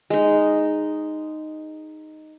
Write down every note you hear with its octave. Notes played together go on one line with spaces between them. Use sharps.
G#3 D#4